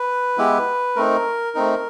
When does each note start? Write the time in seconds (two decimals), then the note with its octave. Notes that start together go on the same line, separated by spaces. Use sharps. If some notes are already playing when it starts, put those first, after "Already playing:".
Already playing: B4
0.38 G#3 B3 E4 G4
0.96 A3 C4 D#4 A#4
1.55 A3 C4 D#4